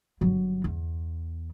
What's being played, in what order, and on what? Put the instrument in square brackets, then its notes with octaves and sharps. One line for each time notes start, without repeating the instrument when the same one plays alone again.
[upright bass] G1 F#3
E2